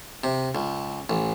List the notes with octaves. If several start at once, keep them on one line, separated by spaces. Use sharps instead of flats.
C3
C#2
A1